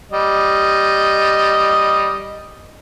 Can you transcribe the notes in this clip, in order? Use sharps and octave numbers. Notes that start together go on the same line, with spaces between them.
G3 D#5